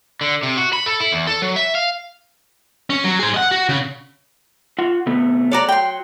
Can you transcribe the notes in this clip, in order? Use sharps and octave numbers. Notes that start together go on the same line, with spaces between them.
D3
C3
F#4
B5
A4
E4
E2
A4
F#3
E5
F5
C#4
F#3
G#4 C5
D#5 F#5
F#4
C#3
F4 F#5
C3 A3 B3
F#4 A4 C#5 D5 A#5
G5 C6